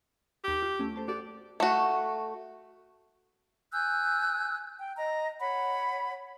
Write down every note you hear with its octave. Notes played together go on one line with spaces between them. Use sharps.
D#2 G4 E6
F4
A3 C#4
A4 C5 A5
F#4 G4 A4 D5
A3 F#4
G#5 E6 F#6 G6
G5
D#5 A#5
C#5 F#5 B5